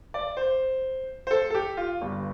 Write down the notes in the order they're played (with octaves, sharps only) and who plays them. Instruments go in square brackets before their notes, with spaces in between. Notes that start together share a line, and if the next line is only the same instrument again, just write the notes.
[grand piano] D5
C5
C5
A4
A4
G4
F4
G1 G2 G3